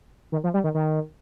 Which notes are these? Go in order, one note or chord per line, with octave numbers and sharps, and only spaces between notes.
D#3
F3
G3
D#3
D#3